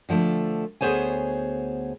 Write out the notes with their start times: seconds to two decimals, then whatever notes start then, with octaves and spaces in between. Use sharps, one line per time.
0.09 D3 F3 G#3 A3
0.81 D2 B3 G#4 C5 C#5 G#5